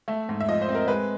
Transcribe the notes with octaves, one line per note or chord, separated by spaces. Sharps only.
A3 E5
G#2
E5
F3 D#5
C5
C4
A#4
G#3 B4